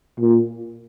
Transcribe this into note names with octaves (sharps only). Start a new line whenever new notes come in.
A#2